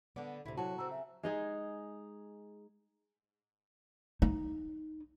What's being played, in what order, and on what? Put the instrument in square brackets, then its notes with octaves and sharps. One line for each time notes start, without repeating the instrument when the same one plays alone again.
[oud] D3 D5 [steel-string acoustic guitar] B3
[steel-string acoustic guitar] D2 A2 C3 [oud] E4
[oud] C3 F#3 [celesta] E4 A5 [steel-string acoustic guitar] F#4 [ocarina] C#5
[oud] C#3 C4 [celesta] A#5 [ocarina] E6
[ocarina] E5
[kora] G#3 D#4 G#4
[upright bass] D#4